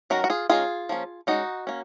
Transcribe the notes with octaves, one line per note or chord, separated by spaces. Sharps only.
D#3 F#3 C#4 F#4 A#4
F#4
F4 G#4
D#3 G#3 C#4 F4 G#4
F3 A#3 C#4
G#3 C#4 D#4 F#4
A#3 C#4